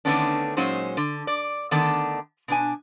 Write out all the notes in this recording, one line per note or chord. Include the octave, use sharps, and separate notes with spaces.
D3 D#3 A3 B3 C#4 D4
A#2 F#3 G#3 C#4 D#4 C5
D3
D5
D3 D#3 A3 B3 D4
B2 D4 G#5